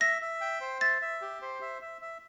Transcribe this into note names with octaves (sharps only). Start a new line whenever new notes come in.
E5 A#6
E5
G5
C5
E5 A6
E5
G4
C5
E5
E5
E5